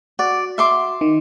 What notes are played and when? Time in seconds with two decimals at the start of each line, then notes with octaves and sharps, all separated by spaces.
0.19 F#4 D5
0.58 E5 C6 D6
1.01 D#3